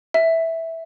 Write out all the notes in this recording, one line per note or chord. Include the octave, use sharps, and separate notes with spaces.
E5